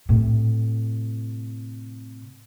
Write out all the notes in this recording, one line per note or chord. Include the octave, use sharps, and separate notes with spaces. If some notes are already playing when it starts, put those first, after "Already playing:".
A2 C3